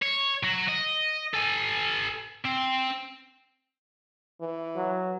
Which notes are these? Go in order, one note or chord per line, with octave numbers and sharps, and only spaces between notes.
C#5
F#3 F#4
D#5
A4 G#5
C4
E3
F#3